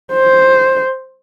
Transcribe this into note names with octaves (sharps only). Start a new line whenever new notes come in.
C5